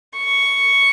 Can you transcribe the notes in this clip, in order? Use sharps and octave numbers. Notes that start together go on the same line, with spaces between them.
C#6